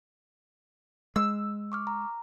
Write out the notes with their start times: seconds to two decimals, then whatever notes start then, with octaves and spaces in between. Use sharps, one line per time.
1.16 G#3 E6
1.72 C#6 D6 F6
1.87 A#5